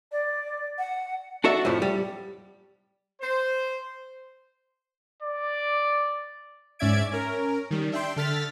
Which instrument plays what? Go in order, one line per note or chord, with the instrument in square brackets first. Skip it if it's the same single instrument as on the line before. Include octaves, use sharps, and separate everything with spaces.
[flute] D5
F#5
[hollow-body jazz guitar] D4 F#4 A4 E5
F2 A2 F3
G3
[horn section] C5
[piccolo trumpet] D5
[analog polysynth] G#2 C#4 D5 E5 G#6 D7
C#4 A#4
D#3 G3
D4 E5 G5 C6
D3 A4 F6 A6 B6